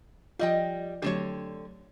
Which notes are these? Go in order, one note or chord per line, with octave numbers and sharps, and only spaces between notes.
F3 G3 F4 D#5 G5
D3 F#3 A3 C4 G4 C#5